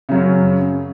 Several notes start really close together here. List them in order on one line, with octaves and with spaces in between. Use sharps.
C#3 F#3 F#2